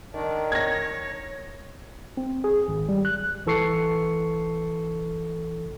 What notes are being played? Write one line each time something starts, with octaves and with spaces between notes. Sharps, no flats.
D#3 D4
C#5 G#6 A#6
C4
G#4
G#1
G3
F#6
A1 E3 A4 C#6 C7 C#7